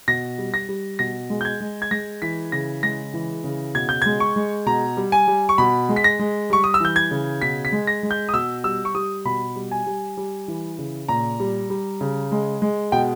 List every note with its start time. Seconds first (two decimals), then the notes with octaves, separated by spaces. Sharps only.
0.08 B2 A#6
0.38 G3
0.54 A#6
0.69 G3
0.99 B2 A#6
1.30 G#3
1.41 G6
1.45 G#6
1.60 G#3
1.82 G#6
1.91 G#3 A#6
2.22 E3 B6
2.52 C#3 A#6
2.83 G#3 A#6
3.13 E3
3.44 C#3
3.75 B2 G#6
3.89 G6
4.02 G#3 G#6
4.20 C#6
4.36 G#3
4.66 B2 A#5
4.97 G3
5.12 G#5
5.28 G3
5.49 C#6
5.58 B2 B5
5.89 G#3
5.96 B6
6.04 A#6
6.19 G#3
6.50 G3 C#6
6.64 D#6
6.74 E6
6.80 E3 G6
6.96 G#6
7.11 C#3
7.42 B2 B6
7.65 B6
7.72 G#3
7.87 A#6
8.03 G#3
8.11 G6
8.29 D#6
8.33 B2 E6
8.64 G3 E6
8.85 C#6
8.94 G3 D#6
9.25 B2 B5
9.56 G3
9.71 G#5
9.86 G3
10.17 G3
10.48 E3
10.78 C#3
11.08 A#2 A#5
11.40 G3
11.70 G3
12.01 C#3
12.32 G#3
12.62 G#3
12.92 B2 G5